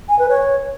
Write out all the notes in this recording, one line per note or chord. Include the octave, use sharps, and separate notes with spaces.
G#5
B4
C#5